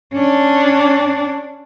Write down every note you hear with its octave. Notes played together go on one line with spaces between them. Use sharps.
C#4 D4